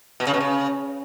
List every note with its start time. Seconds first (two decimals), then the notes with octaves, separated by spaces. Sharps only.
0.20 B2
0.27 C#3
0.34 B2
0.40 C#3